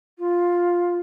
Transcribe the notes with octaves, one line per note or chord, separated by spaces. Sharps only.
F4